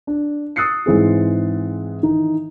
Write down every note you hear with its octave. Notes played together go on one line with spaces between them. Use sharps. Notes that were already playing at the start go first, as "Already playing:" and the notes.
D4
D#6 E6 F#6 A6 C7 C#7
G#2 E3 C4 G#4
D#3 E3 D#4